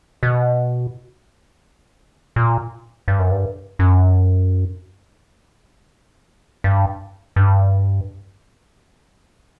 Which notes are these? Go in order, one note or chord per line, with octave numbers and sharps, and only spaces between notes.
B2
A#2
G2
F#2
G2
F#2
G2
G2